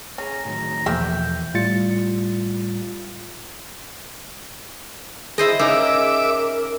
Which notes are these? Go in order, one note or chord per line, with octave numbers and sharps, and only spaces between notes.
C#4 G#4 A#5
A2 D#3 F#3
E2 B2 E3 F3 A3 A#3 E5 G5
A2 G3 F4 A6 C#7
E4 G#4 C5 D#5
C#3 D#4 A#4 E5 D6